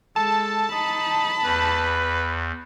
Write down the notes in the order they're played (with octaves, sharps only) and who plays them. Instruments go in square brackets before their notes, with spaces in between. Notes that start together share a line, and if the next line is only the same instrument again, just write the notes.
[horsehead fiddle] G#3 [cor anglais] A4 [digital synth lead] A5
[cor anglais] D#4 [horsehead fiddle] B5
[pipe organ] E2 [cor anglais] B4